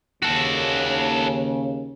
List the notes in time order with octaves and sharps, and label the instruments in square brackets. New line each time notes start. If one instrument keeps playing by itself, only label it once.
[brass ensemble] D#2 C#3 [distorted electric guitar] F#4 A4